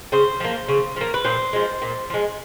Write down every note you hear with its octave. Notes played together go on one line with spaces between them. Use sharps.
C#3 C5
F3 A#3
C#3
F3 A#3
B4
A#2 C5
F3 G#3
A#2
F3 G#3